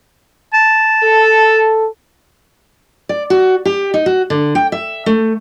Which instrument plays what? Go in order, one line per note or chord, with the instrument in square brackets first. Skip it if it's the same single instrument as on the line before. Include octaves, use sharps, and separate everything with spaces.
[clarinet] A5
[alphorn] A4
[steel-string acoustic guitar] D5
F#4
G4
D#4
F#4
D3
G5
E5
A3